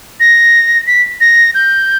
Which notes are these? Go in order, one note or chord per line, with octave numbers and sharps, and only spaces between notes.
A#6
B6
A#6
G6